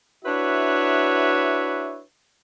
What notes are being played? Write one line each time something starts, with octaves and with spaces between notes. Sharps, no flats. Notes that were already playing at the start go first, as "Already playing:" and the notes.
D4 E4 F#4 B4 C#5 E5